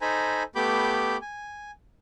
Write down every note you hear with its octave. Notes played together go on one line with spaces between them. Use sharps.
D#4 A4 C5 G#5 A#5 B5
A3 B3 G4 B5 D6 G6
G#5